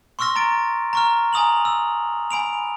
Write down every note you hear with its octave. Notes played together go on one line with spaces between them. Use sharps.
C6 C#6 E6 F6 A#6
A#5 A6 D7
A#5 C#6 F6
G#5 A#5 D#6 F7 F#7
E6
G#5 B5 D7 F7